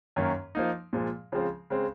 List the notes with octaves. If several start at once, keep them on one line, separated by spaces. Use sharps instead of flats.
F#2 D#3 A#3 C#4
F3 A#3 D#4
A#2 F3 G#3
C#3 F3 G#3 C4
C#3 G#3 C4